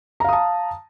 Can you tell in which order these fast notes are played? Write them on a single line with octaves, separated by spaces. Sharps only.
A#5 F5 D#6 A5